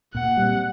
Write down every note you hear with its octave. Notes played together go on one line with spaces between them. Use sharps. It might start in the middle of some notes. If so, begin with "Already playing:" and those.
A#2 F#5
G3 C4